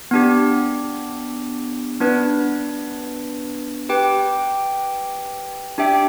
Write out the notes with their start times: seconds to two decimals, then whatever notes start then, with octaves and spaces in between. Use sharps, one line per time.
0.11 B3 D4 G4
2.00 B3 D4 B4
3.89 G4 B4 G5
5.78 D4 G4 E5 G5